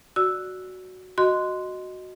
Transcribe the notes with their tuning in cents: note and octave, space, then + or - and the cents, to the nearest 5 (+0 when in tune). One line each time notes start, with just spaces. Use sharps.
F#4 +0 D5 +0 E6 +0
F#4 +0 D#5 +0 C6 -10